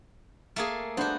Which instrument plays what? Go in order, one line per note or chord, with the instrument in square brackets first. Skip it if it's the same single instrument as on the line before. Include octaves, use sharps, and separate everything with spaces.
[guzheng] A3 A#3 G#4
[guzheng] B3 F#4 [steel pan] D4 C5